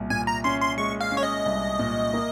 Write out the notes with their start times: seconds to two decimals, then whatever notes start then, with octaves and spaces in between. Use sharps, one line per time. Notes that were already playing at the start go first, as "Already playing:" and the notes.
Already playing: C2 A#2
0.10 A#2 G#5
0.27 A#5
0.44 C#4 C6
0.61 C6
0.77 G#3 C#6
1.01 F5
1.12 C#4
1.17 C#5
1.23 D#5
1.46 C2
1.79 A#2
2.13 A#3